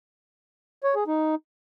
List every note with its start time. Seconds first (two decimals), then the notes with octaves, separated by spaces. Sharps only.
0.84 C#5
0.95 G#4
1.07 D#4